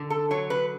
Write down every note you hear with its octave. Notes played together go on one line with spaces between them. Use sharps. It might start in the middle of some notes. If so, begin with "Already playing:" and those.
Already playing: D3
A4
F#3 C#5
B4